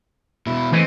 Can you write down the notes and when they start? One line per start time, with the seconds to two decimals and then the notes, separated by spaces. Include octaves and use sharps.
0.47 B2 E4
0.72 E3 A3 C4 D#5